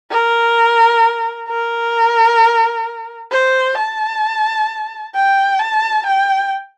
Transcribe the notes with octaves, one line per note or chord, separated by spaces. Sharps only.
A#4
A#4
C5
A5
G5
A5
G5